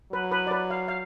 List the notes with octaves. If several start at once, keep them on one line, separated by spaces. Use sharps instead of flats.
F#3 B4
B4
D5
B4
F5
F5